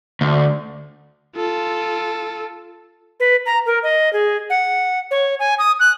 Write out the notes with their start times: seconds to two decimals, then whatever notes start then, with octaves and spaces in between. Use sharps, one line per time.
0.21 D2
1.36 F4 A4
3.20 B4
3.46 A#5
3.66 A#4
3.83 D#5
4.13 G#4
4.50 F#5
5.11 C#5
5.40 G#5
5.59 D#6
5.80 F#6